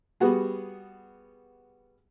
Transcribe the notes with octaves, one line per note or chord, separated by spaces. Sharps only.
G3 B3 F#4 G#4